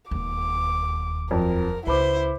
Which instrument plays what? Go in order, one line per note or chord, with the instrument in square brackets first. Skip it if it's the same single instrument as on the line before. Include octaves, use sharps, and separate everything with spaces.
[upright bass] E1 D#2 [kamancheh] D6
[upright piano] F2 F3 F#3 [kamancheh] A#4
[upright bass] C#2 [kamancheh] E4 [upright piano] B4 B5 D6 [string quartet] C5